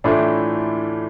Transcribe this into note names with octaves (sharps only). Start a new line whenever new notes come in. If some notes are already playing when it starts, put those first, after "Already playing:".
A2 E3 A3 D4 F4